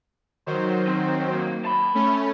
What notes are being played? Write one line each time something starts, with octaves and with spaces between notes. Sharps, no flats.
D#3 F#3 C5
C4
A#3
A5 B5
A3 C#4